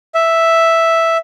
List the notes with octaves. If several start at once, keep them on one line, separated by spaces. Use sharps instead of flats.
E5